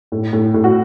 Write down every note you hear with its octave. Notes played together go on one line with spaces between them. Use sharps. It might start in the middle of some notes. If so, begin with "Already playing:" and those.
A2
A2
A2
F#4